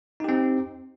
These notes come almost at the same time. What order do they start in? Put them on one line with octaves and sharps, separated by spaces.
D#4 G4 C4